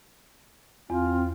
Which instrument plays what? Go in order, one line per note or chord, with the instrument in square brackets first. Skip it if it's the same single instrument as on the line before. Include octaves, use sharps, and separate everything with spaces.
[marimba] E2 [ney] C4 [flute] F4